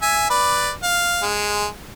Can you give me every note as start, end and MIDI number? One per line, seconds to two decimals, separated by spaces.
0.02 0.28 76
0.02 0.28 80
0.30 0.71 71
0.30 0.71 74
0.83 1.22 77
1.23 1.67 56